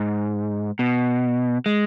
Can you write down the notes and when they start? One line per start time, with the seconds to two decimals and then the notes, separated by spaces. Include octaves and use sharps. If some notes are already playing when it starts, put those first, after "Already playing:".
Already playing: G#2
0.79 B2
1.66 G#3